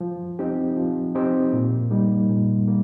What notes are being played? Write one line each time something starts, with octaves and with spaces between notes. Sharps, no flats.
F3
C4 D#4 G4
F3
C4 D#4 G4
A#2
G3 A#3 D#4
A#2
G3 A#3